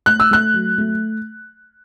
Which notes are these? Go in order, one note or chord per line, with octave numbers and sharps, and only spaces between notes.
A3 F#6
E6
A3 F#6
F#3
A3